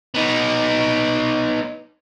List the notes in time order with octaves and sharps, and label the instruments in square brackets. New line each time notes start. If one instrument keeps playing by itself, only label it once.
[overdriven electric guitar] B3 D#4